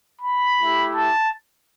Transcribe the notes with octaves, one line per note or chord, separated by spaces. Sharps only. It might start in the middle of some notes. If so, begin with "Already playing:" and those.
B5
A3 E4 G4
A5